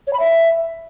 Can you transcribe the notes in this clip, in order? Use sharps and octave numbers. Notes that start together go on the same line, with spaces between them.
C#5
B5
E5